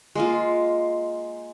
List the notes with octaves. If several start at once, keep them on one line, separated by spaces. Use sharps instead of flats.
G#3 A#3 F4